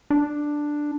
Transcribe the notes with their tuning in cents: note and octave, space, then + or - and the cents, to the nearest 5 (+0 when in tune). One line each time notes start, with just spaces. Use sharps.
D4 +5